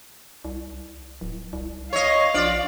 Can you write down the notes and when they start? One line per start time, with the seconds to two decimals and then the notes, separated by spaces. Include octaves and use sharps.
0.45 C2
1.21 D1
1.53 C2
1.93 C#5 D#5 F5
2.34 A#1 F4 D5